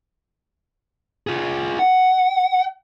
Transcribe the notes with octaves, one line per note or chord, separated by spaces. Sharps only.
F4 G#4
F#5